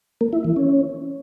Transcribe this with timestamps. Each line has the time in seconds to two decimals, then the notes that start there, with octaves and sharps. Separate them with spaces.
0.21 A#3
0.33 E4
0.44 E3
0.56 C#4